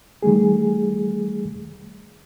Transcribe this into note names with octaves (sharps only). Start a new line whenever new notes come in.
D#3 G3 A3 G#4